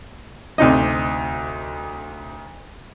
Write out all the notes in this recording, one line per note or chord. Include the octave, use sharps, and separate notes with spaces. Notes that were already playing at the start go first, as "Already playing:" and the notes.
D2 C3 D#4 D#5